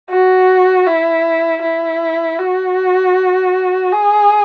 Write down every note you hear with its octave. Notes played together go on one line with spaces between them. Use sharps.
F#4
E4
E4
F#4
G#4